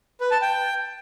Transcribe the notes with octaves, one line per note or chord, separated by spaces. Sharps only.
B4
A5
G5